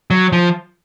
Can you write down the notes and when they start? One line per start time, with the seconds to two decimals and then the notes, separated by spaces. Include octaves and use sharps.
0.11 F#3
0.32 F3